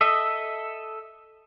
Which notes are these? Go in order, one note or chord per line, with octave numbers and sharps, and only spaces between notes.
A4 D#5 E5